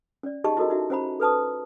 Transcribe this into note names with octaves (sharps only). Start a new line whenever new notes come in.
C#4 D5
D#4 G4 G#4 D#5 A5 C#6
E4 F#4 A4 A#4 D#5
D#4 E4 F#4 E5
C#4 E4 C5 F#5 A#5 B5
A4 B4 A5 D#6